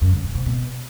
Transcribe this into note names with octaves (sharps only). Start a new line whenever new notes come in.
F#2
C#3
C3
C3
B2